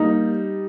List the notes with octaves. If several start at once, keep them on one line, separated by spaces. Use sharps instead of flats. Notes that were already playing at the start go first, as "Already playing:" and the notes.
Already playing: G3 A#3 D#4